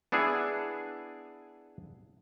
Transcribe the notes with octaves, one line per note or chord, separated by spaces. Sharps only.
B3 D4 E4 G#4